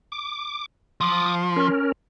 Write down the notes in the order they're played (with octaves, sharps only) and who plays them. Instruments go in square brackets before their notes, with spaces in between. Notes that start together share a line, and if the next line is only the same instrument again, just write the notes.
[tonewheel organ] D6
[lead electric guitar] F3 [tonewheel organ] D6 D#6
[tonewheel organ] C#4 A#4